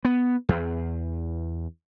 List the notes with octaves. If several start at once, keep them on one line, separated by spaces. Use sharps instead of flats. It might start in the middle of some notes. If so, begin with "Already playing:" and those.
B3
E2